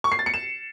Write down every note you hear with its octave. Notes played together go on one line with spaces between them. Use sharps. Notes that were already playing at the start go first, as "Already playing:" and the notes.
C#6
C7
A6
C#7
E7